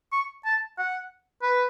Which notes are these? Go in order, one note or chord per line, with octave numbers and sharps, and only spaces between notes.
C#6
A5
F#5
B4